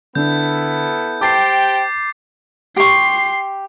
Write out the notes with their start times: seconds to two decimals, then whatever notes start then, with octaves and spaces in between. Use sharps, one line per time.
0.15 D3 B3 E4 A4 G6
1.21 G4 C5 G5 A5 D6 A6 C7
2.76 G4 C6 C#6 C7